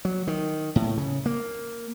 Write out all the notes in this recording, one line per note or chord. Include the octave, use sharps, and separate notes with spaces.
F#3
D#3
A2
C#3
A#3